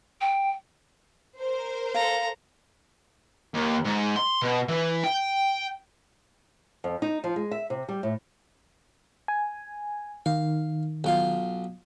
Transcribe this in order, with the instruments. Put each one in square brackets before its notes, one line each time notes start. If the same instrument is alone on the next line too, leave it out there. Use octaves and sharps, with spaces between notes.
[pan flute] G5
[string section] A#4 C5
[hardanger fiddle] A4 A#5 [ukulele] F5
[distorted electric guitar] D#2
G#2
C6
B2
E3
G5
[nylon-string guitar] F2
D#4
F3
G#3
E5
C3
G3
A2
[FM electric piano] G#5
[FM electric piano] D#3 [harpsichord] F5
[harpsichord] B1 F4 F5